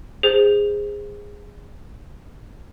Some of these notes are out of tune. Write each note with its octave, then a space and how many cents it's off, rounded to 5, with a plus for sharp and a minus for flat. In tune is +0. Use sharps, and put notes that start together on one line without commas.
G#4 -20 C5 +0